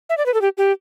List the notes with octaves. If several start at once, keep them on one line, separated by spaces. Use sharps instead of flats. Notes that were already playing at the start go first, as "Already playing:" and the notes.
E5
D5
B4
A4
G4
G4